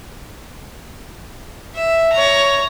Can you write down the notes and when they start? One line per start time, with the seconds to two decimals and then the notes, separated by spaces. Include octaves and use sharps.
1.75 E5
2.13 C#5 A#5